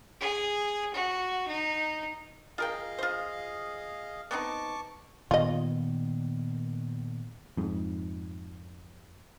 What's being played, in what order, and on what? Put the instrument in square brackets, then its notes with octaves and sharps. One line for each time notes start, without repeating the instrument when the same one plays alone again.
[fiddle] G#4
F#4
D#4
[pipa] F4 A#4 G5 [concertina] G#4 D#5 F5
[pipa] F4 C5
[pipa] B3 C4 D#4 [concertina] A5 C#6 D6
[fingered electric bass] A#2 D#3 B3 [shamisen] F4 D#5
[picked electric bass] F2 G#2